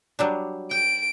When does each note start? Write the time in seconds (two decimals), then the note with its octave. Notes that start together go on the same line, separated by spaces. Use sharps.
0.19 F#3 G3 D4
0.71 G5 D7